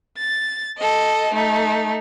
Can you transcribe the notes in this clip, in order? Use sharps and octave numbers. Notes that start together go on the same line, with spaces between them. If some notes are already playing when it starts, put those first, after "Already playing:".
A6
A4 D#5
A3 D#4